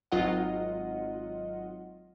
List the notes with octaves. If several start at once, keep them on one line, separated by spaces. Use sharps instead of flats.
G#1 F#3 F4 D#5 F#5